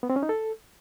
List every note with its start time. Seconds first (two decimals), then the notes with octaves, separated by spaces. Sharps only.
0.03 B3
0.10 C4
0.16 C#4
0.23 D#4
0.29 A4